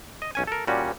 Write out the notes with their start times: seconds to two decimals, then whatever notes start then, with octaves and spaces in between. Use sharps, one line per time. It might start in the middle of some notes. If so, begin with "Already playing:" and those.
0.22 D#5
0.35 B1 C#4 G#5
0.47 A4 A#4
0.67 A#2 G3 C#4 F#4